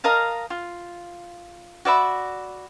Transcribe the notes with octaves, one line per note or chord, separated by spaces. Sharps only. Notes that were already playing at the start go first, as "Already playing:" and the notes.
A#4 D#5 F5 A5
F4
F#4 D5 E5 B5